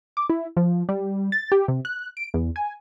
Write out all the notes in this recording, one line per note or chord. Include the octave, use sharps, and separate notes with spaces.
D6
E4
F3
G3
A6
G4
C3
F#6
D7
E2
G#5